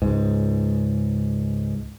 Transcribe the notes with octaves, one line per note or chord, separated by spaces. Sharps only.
C#2 G#2